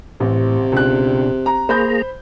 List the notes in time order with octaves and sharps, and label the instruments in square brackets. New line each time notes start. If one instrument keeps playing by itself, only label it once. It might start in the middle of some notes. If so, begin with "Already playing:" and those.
[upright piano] A1 [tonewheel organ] A2 [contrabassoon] C3
[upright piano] C#2 F#6 [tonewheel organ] B2 D4
[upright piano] A#5
[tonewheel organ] A#3 G#4 A#5 [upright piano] C5 B5 G6